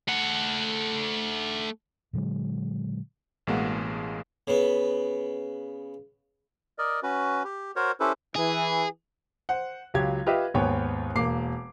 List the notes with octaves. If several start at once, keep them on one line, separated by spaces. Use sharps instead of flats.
A3 F#5
A#2 D3 F#3 G#3
A1 B2 G#3 A#3 F5 F#5
C#3 B3
A#4 D5 D#5
C#4 F#4 B4
G4
F#4 A#4 C5 C#5
C#4 E4 G4 A4 B4 C5
E3 G#4
C5 F#5
C#2 F#3 G4 F5 G#6
F4 G4 B4 D#5 E5 G5
D#2 G#2 B3 C#5 G5
E1 A#3 D6 C7